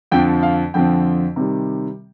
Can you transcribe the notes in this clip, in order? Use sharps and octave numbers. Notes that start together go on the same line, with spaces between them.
F2 D3 F3 C4 G5
F5
F2 D3 F3 C4 G5
C3 D#3 G3